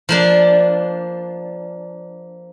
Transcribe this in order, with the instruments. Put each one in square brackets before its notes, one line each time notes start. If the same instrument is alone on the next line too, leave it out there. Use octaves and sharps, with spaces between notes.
[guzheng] F3 A#3 D4